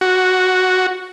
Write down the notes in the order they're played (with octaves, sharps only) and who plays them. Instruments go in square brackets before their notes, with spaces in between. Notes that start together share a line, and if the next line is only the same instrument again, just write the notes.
[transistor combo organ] F#4